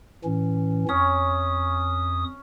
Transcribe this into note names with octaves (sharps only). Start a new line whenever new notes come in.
A2 E3 C#4
F2 C#4 D#6